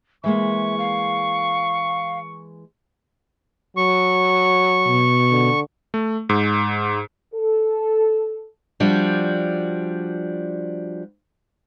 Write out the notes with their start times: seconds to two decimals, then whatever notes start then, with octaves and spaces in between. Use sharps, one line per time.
0.24 E3 G#3 A#3 E5 C#6
0.79 F5
3.77 F#3 C#6
4.88 B2
5.31 D3
5.94 A3
6.29 G#2
7.33 A4
8.80 F3 G3 D4 F#4